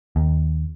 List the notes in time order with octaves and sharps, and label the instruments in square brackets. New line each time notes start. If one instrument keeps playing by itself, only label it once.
[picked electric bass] D#2